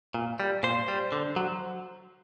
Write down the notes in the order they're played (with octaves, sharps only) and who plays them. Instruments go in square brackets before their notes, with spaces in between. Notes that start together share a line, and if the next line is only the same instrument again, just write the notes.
[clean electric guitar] A#2
G3
A#2 C5
G3
D3
F#3